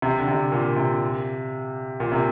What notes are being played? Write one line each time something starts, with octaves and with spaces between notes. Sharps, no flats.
C3
D3
C3
A#2
C3
A#2
C3